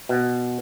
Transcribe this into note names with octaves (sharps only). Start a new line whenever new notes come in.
B2